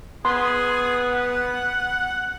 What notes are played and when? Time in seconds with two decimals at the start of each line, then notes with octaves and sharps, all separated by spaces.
0.25 B3 G#4 C6
1.12 F#5